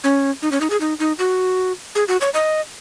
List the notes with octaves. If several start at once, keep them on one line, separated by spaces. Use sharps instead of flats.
C#4
D#4
C#4
D#4
G#4
D#4
D#4
F#4
G#4
F#4
C#5
D#5